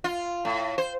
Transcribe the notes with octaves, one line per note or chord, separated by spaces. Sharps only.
F4
A2
C5